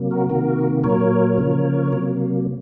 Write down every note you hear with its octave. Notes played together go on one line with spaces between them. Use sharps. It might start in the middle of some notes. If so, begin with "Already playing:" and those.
Already playing: C3 F#3 A#3
F#4 A#4
C3 D#3 A#3 F#4 A#4
A#2 F#3 A#3 A#4 C#5
C#3 F3 A#3
C3 F#3 A#3